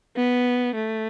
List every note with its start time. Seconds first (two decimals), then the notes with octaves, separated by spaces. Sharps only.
0.16 B3
0.75 A3